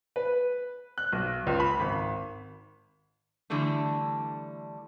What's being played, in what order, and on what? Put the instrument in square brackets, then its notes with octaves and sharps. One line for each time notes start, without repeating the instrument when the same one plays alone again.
[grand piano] B4
F#6
B1
C#2
B5
G#1
[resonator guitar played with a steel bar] D3 E3 G3 A3 D4